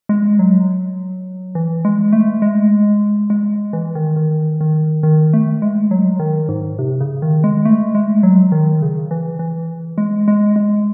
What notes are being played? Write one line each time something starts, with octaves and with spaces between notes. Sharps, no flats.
G#3
F#3
E3
G#3
A3
G#3
G#3
E3
D#3
D#3
D#3
D#3
A3
G#3
F#3
D#3
G#2
C3
C#3
D#3
G#3
A3
G#3
F#3
D#3
C#3
E3
E3
G#3
G#3
G#3